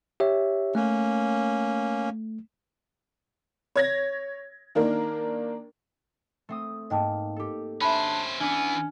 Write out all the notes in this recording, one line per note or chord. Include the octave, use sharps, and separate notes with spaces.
G4 C#5 E5
A3 A#3 C#4
C#5 G#6 A#6
D#3 A#3 D4 A#4
A3 C4 D#6
G#2 A#3 D#5 G5 A5
G4 A4
C#4 D4 C5 E5 G#5 B5
E3 B3 C#4 D4